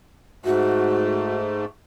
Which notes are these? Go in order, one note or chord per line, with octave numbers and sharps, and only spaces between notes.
G#2 A3 F#4